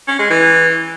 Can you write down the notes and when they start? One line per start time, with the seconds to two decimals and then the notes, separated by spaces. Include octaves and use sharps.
0.08 C#4
0.19 G#3
0.30 E3